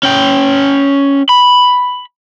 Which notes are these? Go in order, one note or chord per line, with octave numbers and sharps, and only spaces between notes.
C#4 G5
B5